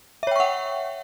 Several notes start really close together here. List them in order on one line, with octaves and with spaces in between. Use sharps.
E5 C#5 G5 C#6 F#5